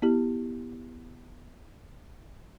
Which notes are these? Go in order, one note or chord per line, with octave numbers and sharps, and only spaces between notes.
B3 E4 G4